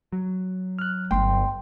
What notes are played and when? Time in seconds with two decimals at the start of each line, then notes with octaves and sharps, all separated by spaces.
0.13 F#3
0.79 F6 F#6
1.11 G1 D4 G5 C6